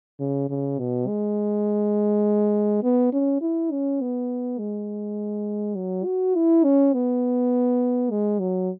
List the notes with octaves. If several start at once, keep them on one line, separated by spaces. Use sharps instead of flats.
C#3
C#3
B2
G#3
B3
C#4
E4
C#4
B3
G#3
F#3
F#4
E4
C#4
B3
G#3
F#3